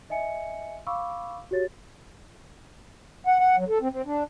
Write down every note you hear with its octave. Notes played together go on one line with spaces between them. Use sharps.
D#5 E5 G#5 C#7
F5 B5 C#6 D6 E6
F#4 G4 C#5 A6
F#5
F#5
F#3
A4
C4
C4
D4